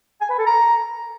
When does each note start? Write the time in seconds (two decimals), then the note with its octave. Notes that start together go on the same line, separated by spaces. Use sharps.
0.21 G#5
0.29 B4
0.38 A4
0.46 A#5